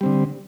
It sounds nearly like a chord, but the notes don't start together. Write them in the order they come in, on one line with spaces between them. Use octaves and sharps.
G3 C4 D3